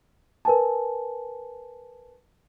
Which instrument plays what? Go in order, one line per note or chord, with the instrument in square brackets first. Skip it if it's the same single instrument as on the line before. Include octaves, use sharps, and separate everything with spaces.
[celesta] A#4 B4 G#5 A5